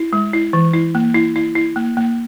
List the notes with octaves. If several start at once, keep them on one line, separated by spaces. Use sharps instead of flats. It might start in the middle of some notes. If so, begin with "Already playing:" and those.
Already playing: E4
G#3
E4
E3
E4
A#3
E4
E4
E4
A#3
A#3